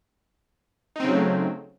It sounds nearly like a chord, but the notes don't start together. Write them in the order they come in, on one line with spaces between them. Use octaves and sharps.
D#4 C4 C#3 F#3 A3